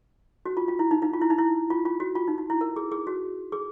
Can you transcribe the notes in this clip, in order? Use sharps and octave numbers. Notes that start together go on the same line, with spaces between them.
F#4
F4
F4
E4
D#4
D#4
F4
E4
D#4
E4
F4
F4
F#4
F4
D#4
D#4
E4
A#4
G#4
G#4
F#4
G#4